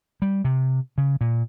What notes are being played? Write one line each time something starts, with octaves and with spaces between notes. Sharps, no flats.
G3
C3
C#3
A#2